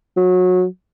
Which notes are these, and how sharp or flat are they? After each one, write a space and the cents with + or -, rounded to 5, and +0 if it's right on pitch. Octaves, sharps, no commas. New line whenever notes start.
F#3 -25